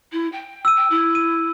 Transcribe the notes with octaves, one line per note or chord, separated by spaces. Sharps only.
E4
G5
E6 D#7
G5
E4
D#7